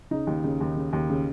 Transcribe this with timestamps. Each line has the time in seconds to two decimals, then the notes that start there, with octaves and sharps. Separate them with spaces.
0.11 C#3 D#4
0.27 D#2
0.44 C#3
0.61 D#2
0.76 C#3
0.93 D#2
1.09 C#3